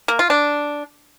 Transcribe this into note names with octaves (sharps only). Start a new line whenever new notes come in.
A#3
F4
D4